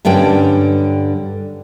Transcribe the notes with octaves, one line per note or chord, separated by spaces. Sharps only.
G2 D3 G3 C#4 G5